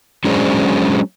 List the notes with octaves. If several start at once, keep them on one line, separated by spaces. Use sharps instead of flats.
F#3 G#3 C#4 D4 G#4 C5